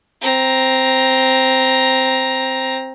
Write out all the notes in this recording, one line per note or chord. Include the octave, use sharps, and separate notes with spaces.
C4 A#5